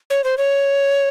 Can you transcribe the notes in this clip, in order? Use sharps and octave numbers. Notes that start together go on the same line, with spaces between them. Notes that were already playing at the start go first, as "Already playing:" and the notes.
C#5
C5
C#5